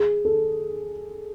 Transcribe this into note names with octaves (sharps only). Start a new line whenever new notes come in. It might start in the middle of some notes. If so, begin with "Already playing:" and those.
Already playing: G#4
A4